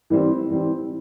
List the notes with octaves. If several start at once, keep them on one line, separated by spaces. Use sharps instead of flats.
E3 G3 C4
E3 G3 C4